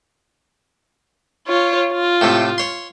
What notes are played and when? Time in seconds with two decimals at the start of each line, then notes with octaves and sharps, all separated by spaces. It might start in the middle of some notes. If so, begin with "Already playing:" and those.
1.47 F4 C#5
1.92 F4
2.21 A2 C3 A3
2.58 C#5 C6